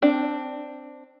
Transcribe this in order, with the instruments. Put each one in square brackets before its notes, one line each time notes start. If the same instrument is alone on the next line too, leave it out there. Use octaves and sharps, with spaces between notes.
[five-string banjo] C4 D4